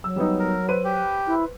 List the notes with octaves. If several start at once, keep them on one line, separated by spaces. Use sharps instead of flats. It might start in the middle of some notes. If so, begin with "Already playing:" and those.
F#3 E6
G3 B3 D#4
A#4
B4 C5 D#7
G4
E4